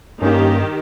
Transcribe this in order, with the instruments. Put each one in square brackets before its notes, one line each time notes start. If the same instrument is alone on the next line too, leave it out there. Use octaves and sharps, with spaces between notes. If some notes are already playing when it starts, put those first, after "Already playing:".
[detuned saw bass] G2 [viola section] D#3 G4 [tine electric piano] A#3 C#4